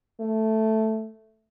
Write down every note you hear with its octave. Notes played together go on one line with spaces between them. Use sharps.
A3